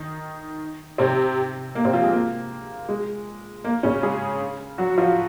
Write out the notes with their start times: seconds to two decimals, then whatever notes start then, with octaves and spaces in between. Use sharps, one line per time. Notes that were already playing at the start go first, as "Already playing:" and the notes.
Already playing: D#3 D#4
0.98 C3 C4
1.75 A#3
1.84 C3 C4
1.93 F3 F4
2.03 G#3 G#4
2.12 A#3
2.89 G#3
3.64 A#3
3.83 C#3 C#4
4.03 G#3 G#4
4.78 F#3 F#4
4.97 F3 F4